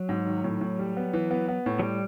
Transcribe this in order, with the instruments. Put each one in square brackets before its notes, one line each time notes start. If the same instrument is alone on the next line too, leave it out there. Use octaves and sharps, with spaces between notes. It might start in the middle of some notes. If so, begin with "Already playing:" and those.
Already playing: [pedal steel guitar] F#3
[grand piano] G#2
D#3
A2
A2
G3
B3
E3
B3
B3
A2
[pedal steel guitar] F#3
G3